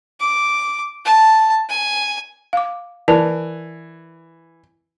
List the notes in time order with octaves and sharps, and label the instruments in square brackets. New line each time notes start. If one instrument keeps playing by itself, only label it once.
[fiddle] D6
A5
G#5
[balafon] F5 D6
[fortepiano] E3 [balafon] A#4 D5 A5